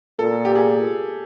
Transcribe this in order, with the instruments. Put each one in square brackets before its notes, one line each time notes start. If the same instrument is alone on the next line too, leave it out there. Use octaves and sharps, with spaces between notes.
[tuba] A#2 [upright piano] A4
[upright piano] G4
G#4